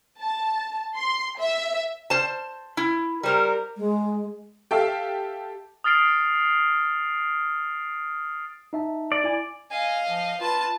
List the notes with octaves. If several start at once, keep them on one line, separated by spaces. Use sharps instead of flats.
A5
C6
E5
C5 A5
E4
G3 A#4 C5 A#5
G#3
G4 A4 E5 F5
D#6 F6 A6 C7 D7
D#4 E5 A5
D5
E4 G#5
D#5 F5 G#5
F3
F4 B4 A5